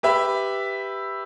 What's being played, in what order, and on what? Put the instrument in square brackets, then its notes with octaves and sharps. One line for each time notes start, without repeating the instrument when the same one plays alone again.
[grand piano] G4 B4 E5